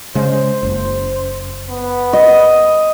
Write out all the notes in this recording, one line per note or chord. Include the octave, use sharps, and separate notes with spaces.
C#3 G#3 C5
F#1 C5
B3
D#5